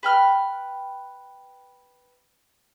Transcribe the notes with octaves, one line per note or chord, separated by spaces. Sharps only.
B4 G5 F6